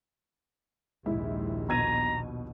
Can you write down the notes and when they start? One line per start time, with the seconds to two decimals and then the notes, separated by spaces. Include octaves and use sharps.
1.06 A#1 D#2 G#2 E4
1.69 B2 A#5 G#6 D#7